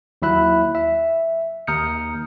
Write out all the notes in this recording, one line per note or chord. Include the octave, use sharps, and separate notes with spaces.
D#2 F#3 E4 E5 B5 F#6
E5
D#2 A#5 D#6 F6 G6 C#7